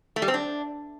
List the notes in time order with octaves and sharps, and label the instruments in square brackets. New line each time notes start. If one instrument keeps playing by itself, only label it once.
[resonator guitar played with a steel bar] A3
G3
C4
D4